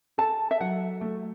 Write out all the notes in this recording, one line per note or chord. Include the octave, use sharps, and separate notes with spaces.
A4 A5
E5
F#3 F#5
A3